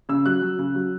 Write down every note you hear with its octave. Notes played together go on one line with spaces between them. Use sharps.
C#3 E6
F#3 F#6
F#3
C#3
F#3